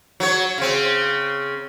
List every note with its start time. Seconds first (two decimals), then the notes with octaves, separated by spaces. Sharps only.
0.20 F#3 C#5
0.58 C#3 C4